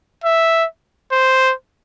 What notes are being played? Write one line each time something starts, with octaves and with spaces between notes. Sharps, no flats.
E5
C5